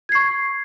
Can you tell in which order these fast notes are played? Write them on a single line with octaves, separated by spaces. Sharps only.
G#6 C7 C#6